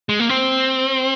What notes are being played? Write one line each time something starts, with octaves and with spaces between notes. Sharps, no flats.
G#3
A#3
C4